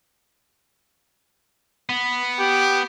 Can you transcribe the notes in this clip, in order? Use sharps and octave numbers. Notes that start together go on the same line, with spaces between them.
B3
G4